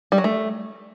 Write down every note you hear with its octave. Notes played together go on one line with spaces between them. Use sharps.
G3
F#3
A3